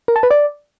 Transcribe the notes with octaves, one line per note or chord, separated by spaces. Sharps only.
A#4
A5
B4
D5